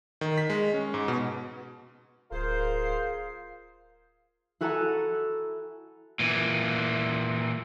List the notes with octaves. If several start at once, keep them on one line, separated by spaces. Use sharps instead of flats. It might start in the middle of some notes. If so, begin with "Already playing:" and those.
D#3
B6
G#3
C#4
G#2
B2
D1 F4 G#4 A#4 C5 F5
E4 F#4 A4 G#5 A#5
A#2 E3